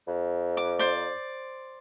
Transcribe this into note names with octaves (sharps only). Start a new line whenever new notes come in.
F2
D6
C5 D5